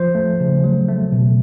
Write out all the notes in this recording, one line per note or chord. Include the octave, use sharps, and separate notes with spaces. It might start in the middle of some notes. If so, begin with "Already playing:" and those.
Already playing: F3 C5
A3
C#3
F#3
A3
B2